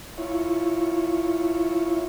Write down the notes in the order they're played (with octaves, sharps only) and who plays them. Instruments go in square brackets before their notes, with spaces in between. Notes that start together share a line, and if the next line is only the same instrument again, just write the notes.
[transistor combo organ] E4 F4 C#5